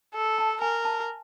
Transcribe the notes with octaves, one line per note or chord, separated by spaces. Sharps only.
A4
A5
A#4 G#5
A5